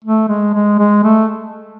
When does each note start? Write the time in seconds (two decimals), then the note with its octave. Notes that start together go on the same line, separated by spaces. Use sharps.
0.05 A3
0.29 G#3
0.54 G#3
0.79 G#3
1.04 A3